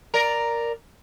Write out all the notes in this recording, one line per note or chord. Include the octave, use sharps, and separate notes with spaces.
A#4 D5